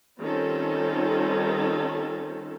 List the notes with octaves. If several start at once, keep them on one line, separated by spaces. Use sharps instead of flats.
D#3 G3 C4 C#4 F4 A4